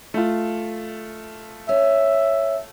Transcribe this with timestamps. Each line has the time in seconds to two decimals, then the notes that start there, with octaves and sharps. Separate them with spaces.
0.14 A3 F4
1.69 C#4 E5